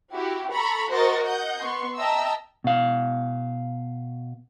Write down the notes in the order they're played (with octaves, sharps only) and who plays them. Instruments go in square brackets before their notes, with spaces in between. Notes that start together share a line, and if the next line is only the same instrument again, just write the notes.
[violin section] E4 F#4 G4
A4 A#5 B5 C#6
F#4 A#4 C5 D#5 C#6 A6
D#5 F#5 G6
B3 C6 C#6
D#5 E5 G5 A5 A#5 E6
[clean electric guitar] B2 F5